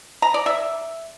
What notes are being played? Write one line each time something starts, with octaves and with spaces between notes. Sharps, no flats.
A#5
D5
E5